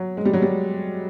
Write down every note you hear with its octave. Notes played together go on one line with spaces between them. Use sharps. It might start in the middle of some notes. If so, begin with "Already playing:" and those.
Already playing: F#3
G#3
G3
F#3
G3